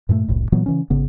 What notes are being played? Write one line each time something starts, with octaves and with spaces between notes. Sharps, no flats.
G2 A#2 G#3 A3
E1 C2 A2
A#2 E3 F#3 B3
C#3 E3 C#4
G#1 C#3 B3